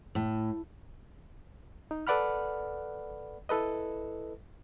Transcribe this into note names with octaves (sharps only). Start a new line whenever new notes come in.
A2
D#4
A4 B4 D5 F#5 B5 F6
E4 A4 B4 D#5